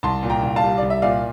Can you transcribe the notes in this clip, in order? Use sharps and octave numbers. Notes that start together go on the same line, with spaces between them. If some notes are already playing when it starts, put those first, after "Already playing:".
C2 A5 C6
A#2
G5 A#5
C2
F5 A5
G3
C2 D5
E5
A#2 D5 F5